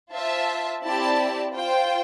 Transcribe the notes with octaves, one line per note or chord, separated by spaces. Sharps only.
F4 C5 E5 A5
C4 E4 G4 D5 A5
F4 C5 G5